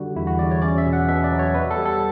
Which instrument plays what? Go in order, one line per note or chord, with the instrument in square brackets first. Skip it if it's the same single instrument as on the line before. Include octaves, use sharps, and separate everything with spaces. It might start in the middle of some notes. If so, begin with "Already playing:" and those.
Already playing: [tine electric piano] D3 G3 F#4
E2 E4
F#4
E2 D5
C#5
C#4 D5
E5
B2
F#5
B2 E5
D5
F#3
C#5
B3 B4
A4
G3
A4